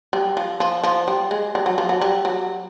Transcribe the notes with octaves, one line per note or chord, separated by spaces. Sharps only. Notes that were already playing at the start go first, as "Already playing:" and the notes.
G3
F3
F3
F3
G3
G#3
G3
F#3
F3
F#3
G3
F#3